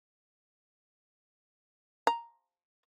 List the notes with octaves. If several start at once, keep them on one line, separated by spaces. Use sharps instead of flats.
A#5